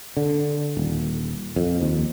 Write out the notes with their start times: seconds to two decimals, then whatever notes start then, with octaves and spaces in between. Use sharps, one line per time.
0.17 D3
0.77 D#1
1.56 F2
1.81 D#2